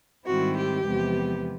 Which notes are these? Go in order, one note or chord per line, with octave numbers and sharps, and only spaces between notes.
G#2 D#3 G3 C4 E4 F#4
G4
E2 C3 F3 G#3 B3